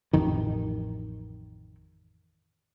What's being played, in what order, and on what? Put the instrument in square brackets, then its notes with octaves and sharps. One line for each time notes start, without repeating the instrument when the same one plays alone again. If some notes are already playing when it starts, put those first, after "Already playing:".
[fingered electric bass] A1 F2 D#3